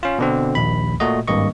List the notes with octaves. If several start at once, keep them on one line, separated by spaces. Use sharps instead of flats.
C#4 F4
B2 D3 C4
A#1 D#2 B5
A#2 A3 F#4 D#5
G#1 G2 A#3 D#5 C#6